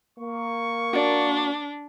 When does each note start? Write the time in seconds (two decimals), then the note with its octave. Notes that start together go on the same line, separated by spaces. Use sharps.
0.18 A#3 C#6
0.93 D4 F#4 D5